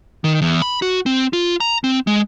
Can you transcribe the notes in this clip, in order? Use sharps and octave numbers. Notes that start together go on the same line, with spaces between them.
D#3
E2
B5
F#4
C4
F4
A#5
C4
G#3